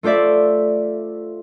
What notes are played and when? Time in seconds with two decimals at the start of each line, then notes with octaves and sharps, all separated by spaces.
0.03 A3 F4 C5 D5 E5